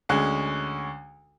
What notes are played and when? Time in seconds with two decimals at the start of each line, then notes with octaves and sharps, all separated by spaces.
0.09 D2 G#3 C#4 F#6